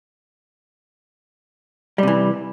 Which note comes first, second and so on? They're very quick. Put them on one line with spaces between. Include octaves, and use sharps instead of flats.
G3 C3 E3